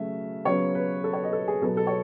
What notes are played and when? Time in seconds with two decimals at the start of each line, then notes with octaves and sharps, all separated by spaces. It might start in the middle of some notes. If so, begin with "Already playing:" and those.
Already playing: C#3 F#3 A3 E5
0.45 C#3 F#3 B3 C#5
0.75 B4
1.04 A4
1.13 C#5
1.23 D#5
1.33 A4
1.48 G#4
1.62 B2 F#3 B3 A4
1.77 A4
1.87 C#5